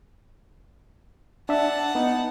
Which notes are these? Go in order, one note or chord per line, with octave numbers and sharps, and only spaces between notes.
D4 E5 F#5 A5
B3 D#4